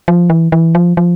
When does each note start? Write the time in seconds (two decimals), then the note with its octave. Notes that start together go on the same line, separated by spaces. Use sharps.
0.08 F3
0.30 E3
0.52 E3
0.75 F3
0.97 F3